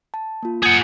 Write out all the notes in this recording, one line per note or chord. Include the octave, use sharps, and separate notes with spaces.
A5
A#3 F4
G#4 F#5 D#6 G6 A6